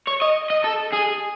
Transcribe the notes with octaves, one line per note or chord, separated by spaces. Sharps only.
C#5
D#5
D#5
A4
G#4